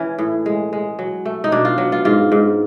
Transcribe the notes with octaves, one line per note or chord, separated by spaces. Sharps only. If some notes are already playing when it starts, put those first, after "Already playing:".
Already playing: E3 C#4
A2
G#3
G#3
F#3
A3
D#4
B2 D4
F4
F#3
F4
G#2 F4
G#2